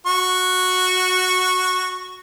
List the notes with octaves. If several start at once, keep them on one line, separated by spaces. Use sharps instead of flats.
F#4 C#6